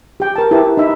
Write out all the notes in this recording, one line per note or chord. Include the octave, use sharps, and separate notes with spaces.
G4 G5
A#4 A5
E4 G4 A#4 B4 A5
D#4 E5 B5